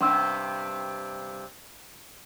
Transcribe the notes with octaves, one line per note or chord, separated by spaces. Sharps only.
G2 C3 C#4 C6 E6